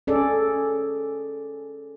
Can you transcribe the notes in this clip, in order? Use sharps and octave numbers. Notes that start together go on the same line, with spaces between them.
C#4 G#4 A4 D5